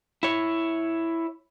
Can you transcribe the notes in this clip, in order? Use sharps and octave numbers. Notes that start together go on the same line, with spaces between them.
E4 C#5